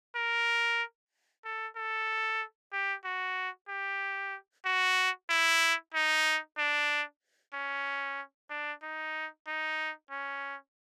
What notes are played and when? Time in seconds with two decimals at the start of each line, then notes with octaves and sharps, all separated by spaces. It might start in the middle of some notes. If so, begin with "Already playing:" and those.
0.15 A#4
1.45 A4
1.76 A4
2.73 G4
3.05 F#4
3.69 G4
4.65 F#4
5.29 E4
5.94 D#4
6.58 D4
7.54 C#4
8.50 D4
8.83 D#4
9.47 D#4
10.11 C#4